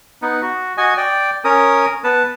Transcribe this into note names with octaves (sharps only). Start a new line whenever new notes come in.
B3 D#4
F#4
F#4 D#5 G#5
D5 G5
C#4 A#4 D#6
B3 B4 A5